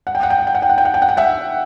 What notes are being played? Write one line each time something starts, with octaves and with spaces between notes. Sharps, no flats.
F#5
G5
F#5
G5
F#5
G5
F#5
G5
F#5
G5
F#5
G5
F#5
G5
E5 F#5